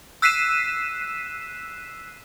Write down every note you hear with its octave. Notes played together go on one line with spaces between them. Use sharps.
E6 F#6 B6 C7 D#7 E7